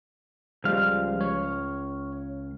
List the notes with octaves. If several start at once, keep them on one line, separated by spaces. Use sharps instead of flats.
C#2 F3 G3 G#3 F5
C#5